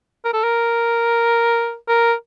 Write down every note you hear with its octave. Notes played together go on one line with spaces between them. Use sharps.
A#4
A4
A#4
A#4